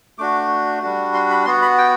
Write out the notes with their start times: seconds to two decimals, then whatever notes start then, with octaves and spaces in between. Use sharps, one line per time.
0.18 A3 D4 F#4 D6
0.82 G3 D4 F#4
1.14 C6
1.30 B5
1.45 B3 F#4 C6
1.62 B5
1.78 G5